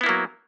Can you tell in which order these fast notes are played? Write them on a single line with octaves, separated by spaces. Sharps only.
B3 E4 A#3 F#3